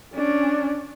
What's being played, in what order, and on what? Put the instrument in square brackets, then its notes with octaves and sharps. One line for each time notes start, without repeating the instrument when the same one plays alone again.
[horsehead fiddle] C#4 D4